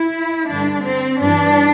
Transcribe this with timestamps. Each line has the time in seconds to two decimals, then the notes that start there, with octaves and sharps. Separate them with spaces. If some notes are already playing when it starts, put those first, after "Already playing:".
Already playing: E4
0.50 G2 D3 D4
0.85 C4
1.21 G2 E3 D4